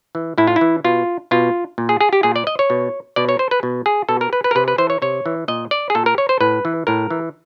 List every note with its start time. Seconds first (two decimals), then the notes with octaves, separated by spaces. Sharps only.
0.15 E3
0.38 A2 E4
0.47 F4
0.56 E4
0.61 E3
0.84 B2 F4
1.31 B2 F4
1.78 A#2
1.89 G#4
2.01 G#4
2.13 G4
2.23 A#2 G#4
2.36 D5
2.47 D#5
2.59 C#5
2.70 B2
3.16 B2 D5
3.29 C#5
3.39 C5
3.51 B4
3.63 B2
3.86 G#4
4.09 B2 A4
4.21 A#4
4.33 B4
4.44 B4
4.51 A#4
4.55 C3 B4
4.68 B4
4.78 E3 C5
4.90 C#5
5.02 C3 C#5
5.26 E3
5.48 A#2 D#5
5.71 D5
5.90 G#4
5.95 A#2 A4
6.06 A#4
6.18 C#5
6.29 C5
6.41 A2 B4
6.65 E3
6.87 A2 A#4
7.10 E3